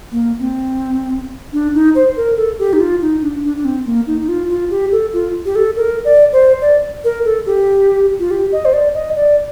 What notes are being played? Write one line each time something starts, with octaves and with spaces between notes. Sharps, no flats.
A#3
C4
D4
D#4
C5
A#4
A4
G4
D#4
F4
D#4
D4
D4
D4
C4
A#3
D#4
D#4
F4
F4
G4
A4
F4
G4
A4
A#4
D5
C5
D5
A#4
A4
G4
F4
G4
D#5
C5
D5
D#5
D5